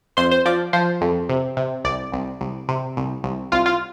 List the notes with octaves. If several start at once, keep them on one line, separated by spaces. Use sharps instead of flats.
F2 C5 C6
C5
F3 D5
F3 C5
F2
C3
C3
C2 D5
C2
C2
C3
C2
C2
C2 F4 F5
F4 F5